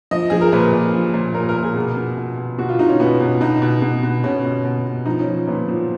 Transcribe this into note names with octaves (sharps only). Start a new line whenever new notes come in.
F3 D#5
F3 G#4
A#4
A#2 B4
A#2
F3
A#2
A#2 A#4
A#4
A#2
G#4
B2
B2
B2
B2
B2 F#4
F4
B2 D#4
C#4
B2 B3
B2
B2 D#4
B2
B2
B2
B2 C#4
B2
B2
B2
F3 D#4
C#4
F3
A#2 B3
F3